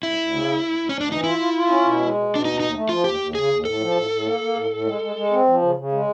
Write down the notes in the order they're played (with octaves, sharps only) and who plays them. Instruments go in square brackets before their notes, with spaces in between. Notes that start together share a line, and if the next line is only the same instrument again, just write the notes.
[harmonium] D2 [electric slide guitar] E4
[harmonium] D2
C#3
D2
D2
D2
[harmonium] D2 [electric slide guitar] C#4
[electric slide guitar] D4
[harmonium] E3 [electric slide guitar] D#4
[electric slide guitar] E4 [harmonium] F4
[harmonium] F4
F4
C#4
B2
G#3
B2
B2
[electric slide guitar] D4
[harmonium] D#2 [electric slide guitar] D#4
[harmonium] D#2 [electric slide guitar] D#4
[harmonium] A3
[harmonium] F3 [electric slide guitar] F4
[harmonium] D#2 [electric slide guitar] G4
[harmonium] D#2
[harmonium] C#3 [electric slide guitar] G#4
[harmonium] D#2
[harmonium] A2 [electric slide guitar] A4
[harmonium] F3
A2
A2
A#3
A#3
A2
A2
G#3
G#3
G#3
C4
F3
C#3
C#3
G#3